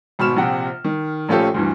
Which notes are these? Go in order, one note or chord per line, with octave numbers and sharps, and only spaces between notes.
G#1 B2 B5 C#6 F6 E7
A#1 C3 F#5 G5
D#3
A#1 A3 C#4 F4 G4 A4
D2 G2 E3